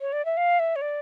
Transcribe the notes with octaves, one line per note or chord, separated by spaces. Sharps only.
C#5
D5
E5
F5
E5
C#5
D5